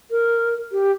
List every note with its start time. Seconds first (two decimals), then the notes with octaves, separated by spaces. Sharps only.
0.11 A#4
0.72 G4